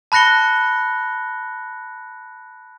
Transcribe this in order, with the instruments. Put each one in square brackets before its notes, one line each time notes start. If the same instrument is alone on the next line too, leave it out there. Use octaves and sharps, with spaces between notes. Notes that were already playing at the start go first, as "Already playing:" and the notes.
[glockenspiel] A5 B5 F#6 A#6 C#7 G7